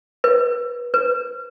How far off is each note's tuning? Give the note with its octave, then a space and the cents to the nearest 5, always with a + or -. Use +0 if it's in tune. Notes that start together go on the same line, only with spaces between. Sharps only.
B4 -30
B4 -10